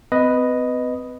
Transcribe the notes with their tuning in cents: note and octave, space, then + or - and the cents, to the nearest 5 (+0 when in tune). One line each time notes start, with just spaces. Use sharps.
C4 -45 B4 +0 D#5 +0